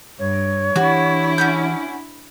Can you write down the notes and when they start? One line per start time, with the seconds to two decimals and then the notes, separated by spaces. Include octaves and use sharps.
0.19 G2 C#5
0.76 E3 D4 E4 F#4 G4 F#5
1.38 C#4 F#4 G6